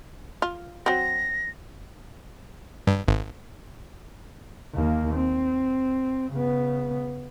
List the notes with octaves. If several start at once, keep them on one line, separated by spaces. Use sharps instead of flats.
F4
F#3 C4 A#6
G2
G#1
D#2 A#3
C4
C#3 B3